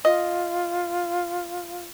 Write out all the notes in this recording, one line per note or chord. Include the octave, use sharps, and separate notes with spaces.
F4 D#5